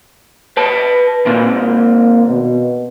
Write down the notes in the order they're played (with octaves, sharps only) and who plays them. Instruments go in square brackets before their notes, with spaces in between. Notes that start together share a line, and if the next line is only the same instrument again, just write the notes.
[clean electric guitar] B4 A5
[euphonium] A#2 [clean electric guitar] D#3 C4
[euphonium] A#3
B2